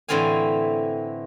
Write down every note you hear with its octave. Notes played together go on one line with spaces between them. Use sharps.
A2 D3 E3 C4 F5 G#5